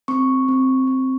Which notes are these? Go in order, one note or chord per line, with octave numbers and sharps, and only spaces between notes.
C4 C#6
C4
C4